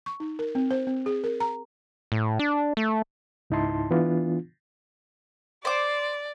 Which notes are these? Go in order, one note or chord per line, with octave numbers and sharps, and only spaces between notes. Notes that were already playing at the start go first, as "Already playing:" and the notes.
C#6
D#4
A#4
C4
C5
C4
G#4
A#4
A#5
A2
D4
A3
C#2 G#2 D#4 E4 A5 C6
E3 B3 D4 F4
C5 D5 D6